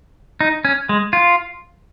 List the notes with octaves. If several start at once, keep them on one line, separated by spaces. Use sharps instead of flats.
D#4
C#4
G#3
F4